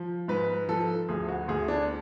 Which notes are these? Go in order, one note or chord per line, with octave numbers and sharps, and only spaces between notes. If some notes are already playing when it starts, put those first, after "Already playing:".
Already playing: F3
G#2 B4
F3 A4
D2 G#4
F#4
D2 G#4
D4